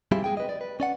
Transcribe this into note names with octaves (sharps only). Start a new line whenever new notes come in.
G3 C4 E4 F4 G4 G#4
G#3 G#4 G5
B4 D#5
D5
B4
C#4 D5 F#5